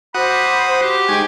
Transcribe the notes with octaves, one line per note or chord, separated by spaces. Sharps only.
F#4 C5 F#5 B5 D6 D#6
C5
G4
G#3 D#4 G5 G#5 C#6